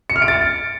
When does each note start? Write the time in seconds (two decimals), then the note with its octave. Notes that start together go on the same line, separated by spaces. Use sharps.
0.10 C#7
0.16 F6
0.22 D7
0.28 A6